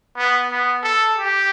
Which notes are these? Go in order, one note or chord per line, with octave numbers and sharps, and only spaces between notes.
B3
B3
A4
G4